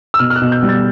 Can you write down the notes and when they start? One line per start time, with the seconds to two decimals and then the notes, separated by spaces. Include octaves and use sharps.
0.14 E6
0.19 B2 F6
0.30 F6
0.36 F#6
0.41 B2
0.52 G6
0.63 G3
0.69 A6